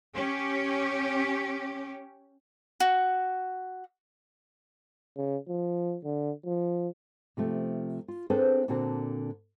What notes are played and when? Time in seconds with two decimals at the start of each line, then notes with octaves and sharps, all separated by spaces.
0.14 C#4 G4
2.80 F#4
5.17 C#3
5.48 F3
6.04 D3
6.45 F3
7.37 C3 F3 A3
8.08 F4
8.30 C4 D4 G#4 A4 B4 C5
8.68 A#2 D3 C4 F#4 A5